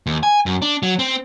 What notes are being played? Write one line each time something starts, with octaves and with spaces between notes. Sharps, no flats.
D#2
G#5
F#2
D4
F#3
C4